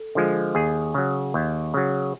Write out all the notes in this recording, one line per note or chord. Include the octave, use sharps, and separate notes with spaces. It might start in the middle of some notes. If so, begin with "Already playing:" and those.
Already playing: A4
D3 F3 G#3
D#2 G#4
C#3 F#3
D#2
C#3 F#3